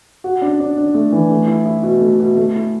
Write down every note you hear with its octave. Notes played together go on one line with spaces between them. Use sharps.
F#4
D4
D4
D4
A3
E3
A3
E4
E4
B2
A3
B2
A3
E4